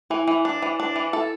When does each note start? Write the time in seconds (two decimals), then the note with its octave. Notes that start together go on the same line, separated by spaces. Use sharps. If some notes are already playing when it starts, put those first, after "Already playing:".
0.10 E3 E4
0.28 E3
0.45 D4
0.62 E3
0.80 D4
0.96 E3
1.13 E4 A4